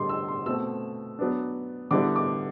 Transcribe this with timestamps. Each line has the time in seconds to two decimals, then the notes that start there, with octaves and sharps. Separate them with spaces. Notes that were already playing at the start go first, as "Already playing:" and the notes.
Already playing: D3 G3 D4 C6
0.09 E6
0.28 C6
0.46 B2 A3 C4 E6
1.19 F#3 B3 D4
1.91 D3 G3 B3 E4 D6
2.16 D6